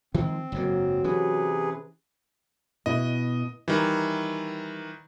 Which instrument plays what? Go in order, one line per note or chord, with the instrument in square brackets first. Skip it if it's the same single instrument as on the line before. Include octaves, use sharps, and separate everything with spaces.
[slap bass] D#3 F3 G#3 [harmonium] C4
[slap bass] F#1 G#2 A#3 [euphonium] F#3
[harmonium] C3 G#4 B4 [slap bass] E3 C#4
[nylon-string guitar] B2 E4 [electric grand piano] D#5
[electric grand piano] D#3 E3 [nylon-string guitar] G3